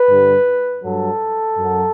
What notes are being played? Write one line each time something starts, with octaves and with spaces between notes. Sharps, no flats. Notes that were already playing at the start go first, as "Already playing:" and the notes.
Already playing: B4
G2 D3 G3
G2 F#3 A4
F#2
F#3